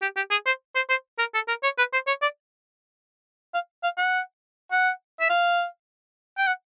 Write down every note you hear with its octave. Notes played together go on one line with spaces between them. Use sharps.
G4
G4
G#4
C5
C5
C5
A#4
A4
A#4
C#5
B4
C5
C#5
D5
F5
F5
F#5
F#5
E5
F5
G5
F#5